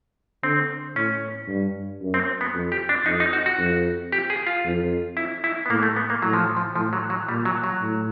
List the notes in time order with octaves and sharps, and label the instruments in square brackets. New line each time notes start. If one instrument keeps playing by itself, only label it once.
[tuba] D3 [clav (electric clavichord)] C4
[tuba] A2 [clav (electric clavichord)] C#4
[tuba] G2
F#2
[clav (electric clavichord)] C4
B3
[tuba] F2
[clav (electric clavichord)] G4
D4
[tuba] F2 [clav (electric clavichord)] D#4
[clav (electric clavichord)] D#4
F#4
F#4
[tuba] F2
[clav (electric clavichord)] G4
G#4
F4
[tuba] F2
[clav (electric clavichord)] E4
E4
B3
[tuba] A2 [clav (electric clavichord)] A#3
[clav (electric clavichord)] A3
B3
A#3
[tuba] A2 [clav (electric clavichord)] F#3
[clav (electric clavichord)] F3
F3
[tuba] A2 [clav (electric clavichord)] F3
[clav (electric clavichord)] F#3
F#3
[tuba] A#2 [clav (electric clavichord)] G3
[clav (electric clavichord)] F#3
F#3
[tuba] A2